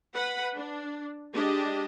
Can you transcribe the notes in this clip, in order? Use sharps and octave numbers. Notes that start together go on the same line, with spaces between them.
B4 F#5 B5
D4
G#3 D4 G4 D#5